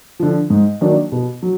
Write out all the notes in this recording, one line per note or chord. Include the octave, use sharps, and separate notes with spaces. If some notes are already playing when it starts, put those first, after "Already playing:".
D3 F3
G#2
D#3 F#3 A#3 D4
B2
F#3